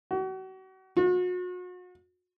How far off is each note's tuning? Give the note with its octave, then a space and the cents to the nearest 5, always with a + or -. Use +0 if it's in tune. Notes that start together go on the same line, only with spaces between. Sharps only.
F#4 +35
F#4 -40